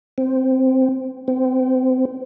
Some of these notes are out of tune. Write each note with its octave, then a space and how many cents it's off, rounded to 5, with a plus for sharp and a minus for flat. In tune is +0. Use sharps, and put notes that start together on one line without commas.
C4 -5
C4 -25